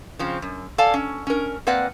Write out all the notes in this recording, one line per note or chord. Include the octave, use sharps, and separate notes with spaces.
C#3 F3 C4
F#2
A4 D5 F5 G#5 A5
C#4
C#4 A#4
A#3 C4 B4 D5 F#5